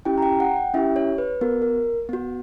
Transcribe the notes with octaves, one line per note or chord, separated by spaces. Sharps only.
C#4 E4 G4 G5
A#5
G5
F#5
G5
C#4 E4 G4 E5
C#5
B4
B3 F#4 A#4
A#4
B3 F#4